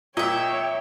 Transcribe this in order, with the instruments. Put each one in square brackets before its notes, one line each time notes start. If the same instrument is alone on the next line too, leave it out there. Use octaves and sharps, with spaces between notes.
[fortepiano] A#2 [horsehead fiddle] C#5 G5 [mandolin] D#5 E5 [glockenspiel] D#6